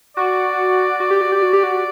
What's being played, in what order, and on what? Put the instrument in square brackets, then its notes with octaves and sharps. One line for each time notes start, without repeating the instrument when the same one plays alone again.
[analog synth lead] F#4 [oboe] D5
[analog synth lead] F#4
G4
F#4
G4
F#4
G4
F#4